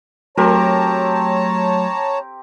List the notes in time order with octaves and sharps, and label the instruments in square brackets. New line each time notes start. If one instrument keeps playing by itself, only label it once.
[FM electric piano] F#3 A3 [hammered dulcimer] C4 G4 A#4 [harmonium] C#5 A5 A#5